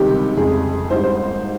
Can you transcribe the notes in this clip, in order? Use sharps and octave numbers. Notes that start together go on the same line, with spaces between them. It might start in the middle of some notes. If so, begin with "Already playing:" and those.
Already playing: C#2 C3 D#3 G3 G4
F2 C#3 G#3 G#4
G#1 G#2 G3 C5
C5